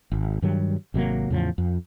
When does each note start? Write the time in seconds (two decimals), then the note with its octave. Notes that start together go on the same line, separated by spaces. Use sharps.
0.12 G#1
0.42 G2 D#3 F#3 G3
0.94 G#1 C3 F#3 A#3
1.30 E2 A2 C#3 F3
1.58 F2